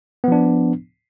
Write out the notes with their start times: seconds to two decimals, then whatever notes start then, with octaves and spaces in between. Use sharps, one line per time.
0.24 B3
0.28 F3
0.32 D4